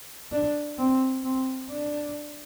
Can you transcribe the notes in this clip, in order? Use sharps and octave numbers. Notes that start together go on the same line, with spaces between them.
D4
C4
C4
D4